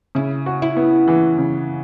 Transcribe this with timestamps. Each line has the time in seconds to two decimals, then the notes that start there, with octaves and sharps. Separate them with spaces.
0.15 C#3 E4
0.46 F#4
0.62 E4
0.76 B3
1.08 E3
1.38 C#3